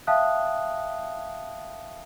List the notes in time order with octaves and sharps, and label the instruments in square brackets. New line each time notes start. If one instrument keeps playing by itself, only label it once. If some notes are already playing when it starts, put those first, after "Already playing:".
[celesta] E5 F5 G5 A5 D#6 F#6